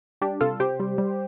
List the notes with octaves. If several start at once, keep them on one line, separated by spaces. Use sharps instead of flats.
G3 D4 G4
C3 F4 A4
C3 G4 C5
G3
G3